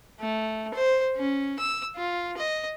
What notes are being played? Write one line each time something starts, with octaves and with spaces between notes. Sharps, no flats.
A3
C5
C#4
E6
F4
D#5